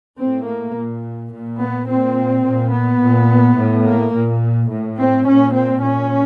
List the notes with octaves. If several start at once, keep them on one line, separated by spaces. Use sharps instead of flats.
A2 C4
A#3
A#2
A#2
B3
A#2 C4
A#2
B3
A#2
A2
A#3
A#2
A2
C4
A#2 C#4
C4
A#2 C#4